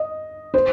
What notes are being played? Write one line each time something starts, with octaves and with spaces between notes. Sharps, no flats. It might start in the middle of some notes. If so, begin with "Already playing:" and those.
Already playing: D#5
C5